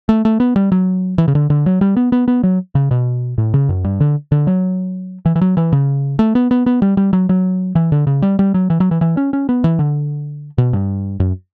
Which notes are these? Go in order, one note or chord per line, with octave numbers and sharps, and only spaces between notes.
A3
A3
B3
G3
F#3
E3
C#3
D3
D3
F#3
G3
B3
B3
B3
F#3
C#3
B2
A2
C#3
F#2
G2
D3
D3
F#3
E3
E3
F#3
E3
C#3
A3
B3
B3
B3
G3
G3
F#3
F#3
E3
D3
C#3
G3
G3
F#3
E3
F#3
E3
E3
C#4
C#4
B3
E3
D3
B2
G2
F#2